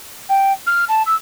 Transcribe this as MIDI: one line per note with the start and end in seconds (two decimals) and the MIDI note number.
0.29 0.52 79
0.67 0.85 89
0.89 1.03 81
1.06 1.15 88